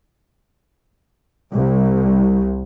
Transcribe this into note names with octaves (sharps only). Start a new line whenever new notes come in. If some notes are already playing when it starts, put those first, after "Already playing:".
C2